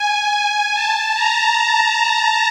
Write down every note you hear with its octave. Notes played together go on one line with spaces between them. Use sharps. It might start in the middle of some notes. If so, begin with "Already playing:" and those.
Already playing: G#5
A5
A#5